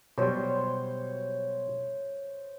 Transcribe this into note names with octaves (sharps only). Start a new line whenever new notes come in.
B2 F#3 G3 C5 C#5